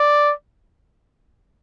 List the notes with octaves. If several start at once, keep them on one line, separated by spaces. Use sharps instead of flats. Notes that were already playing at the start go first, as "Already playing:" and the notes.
Already playing: D5